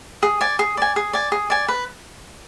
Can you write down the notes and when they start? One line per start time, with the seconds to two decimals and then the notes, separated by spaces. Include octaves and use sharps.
0.23 G#4
0.41 D5 G#5
0.59 G#4
0.77 D5 G#5
0.96 G#4
1.13 D5 G#5
1.32 G#4
1.50 D5 G#5
1.68 B4